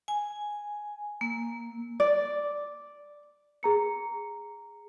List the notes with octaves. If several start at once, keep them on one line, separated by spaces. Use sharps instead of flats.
G#5
A#3
D5
G#4 A#5 C#7